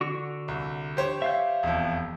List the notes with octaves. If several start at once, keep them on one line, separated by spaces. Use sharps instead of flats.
D3 F#4 C#6
C2
G4 C5 C#5
E5 F5 G6
E1 F2